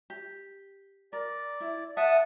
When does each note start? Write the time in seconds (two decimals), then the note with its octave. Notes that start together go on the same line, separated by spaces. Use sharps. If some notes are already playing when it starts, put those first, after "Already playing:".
0.10 G4
1.13 A#4 D5
1.61 E4
1.97 E5 F#5 A5 D#6